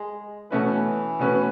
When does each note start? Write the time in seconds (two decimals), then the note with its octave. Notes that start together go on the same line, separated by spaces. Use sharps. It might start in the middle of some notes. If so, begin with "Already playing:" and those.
Already playing: G#3
0.51 B2 E3 A3 C#4 F#4 B4
1.19 B2 A3 C#4 F#4 B4